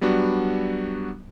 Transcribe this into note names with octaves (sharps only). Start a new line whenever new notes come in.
F#3 G3 B3 D4 F#4